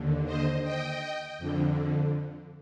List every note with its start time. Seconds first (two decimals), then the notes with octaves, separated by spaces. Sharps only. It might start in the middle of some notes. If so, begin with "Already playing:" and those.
Already playing: D#2 D3
0.25 C5 D#5
0.63 D#5 G5
1.38 F2 D3